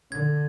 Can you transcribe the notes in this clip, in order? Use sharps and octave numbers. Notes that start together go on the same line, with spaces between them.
D3 G#6